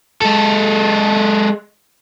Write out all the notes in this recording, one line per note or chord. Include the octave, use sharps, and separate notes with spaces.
G#3 A4